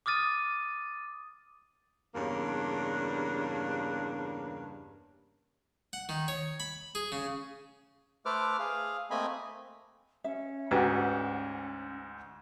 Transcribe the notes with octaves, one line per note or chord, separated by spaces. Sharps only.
D6 D#6 F6 A6 D#7
E2 G2 C#3 A#3 D4
F#5
D#3
C#5
B5
G#4
C#3
A3 A4 B4 C5 D6 F6
G#4 F5
A3 A#3 C4 D#5 G#5 B5
C#4 E5
D2 G#2 F#4 G4 B4